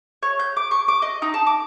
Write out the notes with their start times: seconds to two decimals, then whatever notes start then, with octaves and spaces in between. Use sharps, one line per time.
0.23 C#5
0.39 G6
0.57 D6
0.71 C#6
0.88 D6
1.02 D#5
1.22 D#4
1.34 A5
1.47 D6